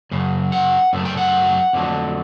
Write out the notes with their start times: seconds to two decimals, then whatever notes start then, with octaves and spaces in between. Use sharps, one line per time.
0.11 F#2 C#3
0.52 F#5
0.93 F#2 C#3 A3
1.05 G5
1.17 F#5
1.73 F2 D3 F#3 A3